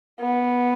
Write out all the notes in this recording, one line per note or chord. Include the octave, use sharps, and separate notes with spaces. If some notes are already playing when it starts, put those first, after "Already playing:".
B3